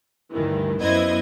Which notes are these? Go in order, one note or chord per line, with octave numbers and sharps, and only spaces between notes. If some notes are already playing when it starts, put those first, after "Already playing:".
D2 G2 D#3 E3
F#2 B3 E4 C5 D#5 G#6